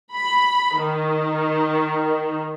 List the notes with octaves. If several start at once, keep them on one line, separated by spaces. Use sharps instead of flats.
B5
D#3